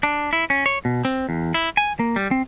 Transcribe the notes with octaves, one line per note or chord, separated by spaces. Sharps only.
D4
E4
C#4
C#5
B2
C4
E2
E4
G#5
A#3
G3
C4